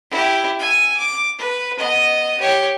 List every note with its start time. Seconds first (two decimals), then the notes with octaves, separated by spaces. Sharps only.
0.11 E4 G4
0.59 G#5 E6
0.98 D6
1.38 B4
1.78 B3 D#5
2.39 G4 C#5